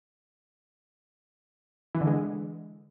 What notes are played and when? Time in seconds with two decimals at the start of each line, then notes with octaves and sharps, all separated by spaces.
1.95 E3
2.01 D3
2.07 G#3